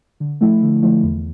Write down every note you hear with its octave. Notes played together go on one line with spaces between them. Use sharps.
D3
F3 A3 E4
D3
F3 A3 E4
E2